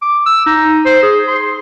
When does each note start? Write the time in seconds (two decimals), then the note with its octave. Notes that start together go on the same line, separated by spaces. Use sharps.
0.02 D6
0.26 E6
0.46 D#4
0.86 C5
1.03 G#4
1.28 C6